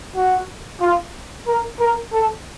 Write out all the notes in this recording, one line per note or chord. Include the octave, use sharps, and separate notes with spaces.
F#4
F4
A#4
A#4
A4